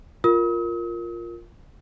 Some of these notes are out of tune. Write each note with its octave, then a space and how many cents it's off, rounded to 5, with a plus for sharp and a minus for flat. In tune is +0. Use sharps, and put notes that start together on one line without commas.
F4 +0 A#4 +0 D#6 +45